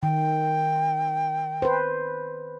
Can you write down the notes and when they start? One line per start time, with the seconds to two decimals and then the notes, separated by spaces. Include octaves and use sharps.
0.03 D#3 G5
1.62 B4 C5